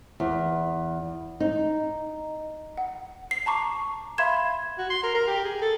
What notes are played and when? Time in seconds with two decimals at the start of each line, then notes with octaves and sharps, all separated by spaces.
0.20 E2
1.40 D#4
2.78 F#5
3.31 C7
3.46 A5 A#5 C#6 D6
4.18 E5 F5 B5 C6 G#6 E7
4.78 F#4
4.90 C6
5.03 A#4
5.14 A#4
5.27 G4
5.45 G#4
5.61 A4